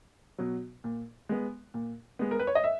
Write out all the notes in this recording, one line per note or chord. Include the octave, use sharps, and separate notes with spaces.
B2 F#3
A#2
G#3 B3
A#2
G#3 B3
A#4
B4
C#5
D#5
E5